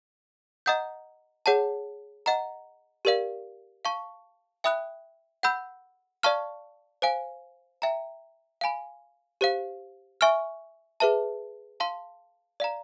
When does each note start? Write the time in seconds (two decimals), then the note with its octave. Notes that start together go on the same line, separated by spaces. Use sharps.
0.66 D#5 F#5 A#5 D#6 G6
1.46 G#4 C#5 F#5 A5
2.26 D#5 F#5 A#5
3.05 G4 A#4 D5 F5
3.85 F5 A5 C#6
4.64 E5 G5 B5 D#6 F#6
5.43 F#5 B5 E6 G6
6.23 D5 F5 A5 C#6 F6
7.02 C5 F5 G#5
7.82 E5 G5 A#5
8.61 F5 G#5 B5
9.41 G4 C5 F5
10.21 E5 G#5 C#6 F6
11.00 G#4 B4 E5 A5
11.80 F5 A5 C6
12.60 D5 F5 A#5